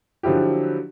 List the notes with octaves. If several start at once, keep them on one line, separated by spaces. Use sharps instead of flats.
D3 F3 F#3 E4 G4